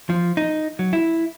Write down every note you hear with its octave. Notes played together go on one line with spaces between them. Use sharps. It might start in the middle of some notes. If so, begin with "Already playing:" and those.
F3
D#4
F#3
E4